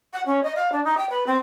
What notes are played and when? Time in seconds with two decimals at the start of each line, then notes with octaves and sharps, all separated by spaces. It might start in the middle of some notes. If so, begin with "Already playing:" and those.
0.13 F#5
0.26 C#4
0.43 D#5
0.55 F5
0.72 D4
0.84 D#4
0.97 G5
1.09 B4
1.26 C4